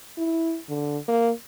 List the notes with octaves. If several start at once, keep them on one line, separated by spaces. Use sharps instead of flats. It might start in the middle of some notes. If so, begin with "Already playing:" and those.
E4
D3
A#3